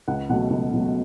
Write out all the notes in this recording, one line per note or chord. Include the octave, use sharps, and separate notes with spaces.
C#2 F#5
B2 F#3 A3 F#5
C#2
B2 F#3 A3